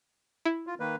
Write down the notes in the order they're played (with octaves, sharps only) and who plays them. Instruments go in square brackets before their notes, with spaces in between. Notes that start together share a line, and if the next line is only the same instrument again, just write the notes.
[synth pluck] E4
[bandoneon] F4
D#3 A#3 B4